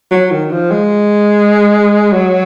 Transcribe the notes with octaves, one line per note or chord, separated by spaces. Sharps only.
F#3
D#3
F3
G#3
F#3